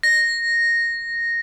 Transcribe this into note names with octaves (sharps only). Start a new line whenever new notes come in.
A#6